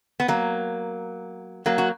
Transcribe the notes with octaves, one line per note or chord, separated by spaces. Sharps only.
B3
F#3 A#3
F#3 A#3
F#4